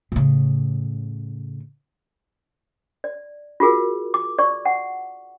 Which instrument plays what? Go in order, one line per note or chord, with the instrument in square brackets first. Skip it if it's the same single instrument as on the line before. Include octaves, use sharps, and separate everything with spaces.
[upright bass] A2 C#3
[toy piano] D5
F4 F#4 G#4 A#4
D6
D5 C#6
F#5